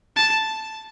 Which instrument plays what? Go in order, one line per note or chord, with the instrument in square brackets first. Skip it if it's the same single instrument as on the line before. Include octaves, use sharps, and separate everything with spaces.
[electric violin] A5